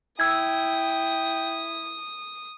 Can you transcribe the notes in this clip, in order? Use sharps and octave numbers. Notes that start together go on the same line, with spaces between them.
E4 G5 D#6 E6 G#6